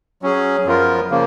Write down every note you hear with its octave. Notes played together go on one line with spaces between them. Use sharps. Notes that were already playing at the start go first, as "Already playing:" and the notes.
F#3 C#4 G#4
F#2 F3 B3 F4 A#4
C#3 F3 A#3